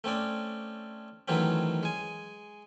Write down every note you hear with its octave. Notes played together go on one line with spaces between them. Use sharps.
A3 C4 C#4 D5
D#3 E3 F#3 A3 C4 C#4
G#3 G#5